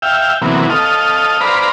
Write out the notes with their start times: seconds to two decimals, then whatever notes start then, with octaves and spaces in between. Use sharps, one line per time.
0.02 E5 F5 G5
0.42 C3 E3 F#3 A#3 B3
0.69 A4 D#5 F5
1.41 B4 C5 D5 F5 A#5 B5